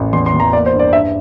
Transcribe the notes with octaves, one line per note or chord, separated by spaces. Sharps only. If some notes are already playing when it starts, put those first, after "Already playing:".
Already playing: A1
E2 C6
C6
E2
A#5
A#3 D5
C5
G2
D5
G2 E5